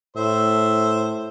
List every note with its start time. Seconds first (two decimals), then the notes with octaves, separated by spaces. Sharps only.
0.17 A2 C5 E5